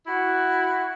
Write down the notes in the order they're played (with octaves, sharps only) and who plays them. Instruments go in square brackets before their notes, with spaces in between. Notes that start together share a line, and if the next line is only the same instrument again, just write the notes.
[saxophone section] E4 F#4